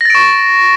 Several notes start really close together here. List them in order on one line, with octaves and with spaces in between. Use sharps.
A#6 A6 D7 C#6